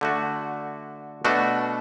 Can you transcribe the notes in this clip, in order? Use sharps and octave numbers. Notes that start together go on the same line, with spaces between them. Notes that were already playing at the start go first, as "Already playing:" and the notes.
D3 A3 F#4
B2 A3 D4 F#4